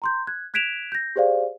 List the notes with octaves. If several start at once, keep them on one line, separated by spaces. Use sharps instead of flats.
A#5 C6 G6
F#6 G#6
F#6 G#6 B6 D7 E7 F7
G6 A#6
G4 G#4 C5 D5 F5